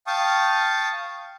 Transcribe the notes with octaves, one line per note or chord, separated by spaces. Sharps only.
F5 G5 A5 C#6 D#6